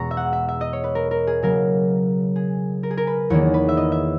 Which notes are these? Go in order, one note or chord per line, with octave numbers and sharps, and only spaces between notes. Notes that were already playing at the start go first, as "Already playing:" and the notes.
Already playing: E2 B2 G#3 B3 A#5 C#6
E5
F#5
E5
E5
D#5
C#5
B4
A#4
A#4
G#4
C#3 F#3 A#3 A#4
G#4
A#4
G#4
A#4
B4
E2 D#3 A#3 C#5
B4
E5
D#5
E5